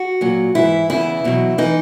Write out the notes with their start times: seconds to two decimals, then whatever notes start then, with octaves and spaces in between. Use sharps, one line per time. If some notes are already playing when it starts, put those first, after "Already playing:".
Already playing: F#4
0.21 A#2 F#3
0.55 G#2 E3 E4
0.90 E2 C#3 E3 E4
1.24 E2 B2 F#3
1.58 E3 D#4